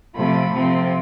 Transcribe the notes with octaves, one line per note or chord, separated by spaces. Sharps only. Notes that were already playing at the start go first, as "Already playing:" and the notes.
C3 F3 A3 C4 B5
C3 F3 C4